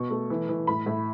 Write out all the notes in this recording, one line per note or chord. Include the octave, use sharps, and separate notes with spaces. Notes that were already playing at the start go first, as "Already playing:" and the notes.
Already playing: B2 C#6
A3
E3
E3
A2 B5
A2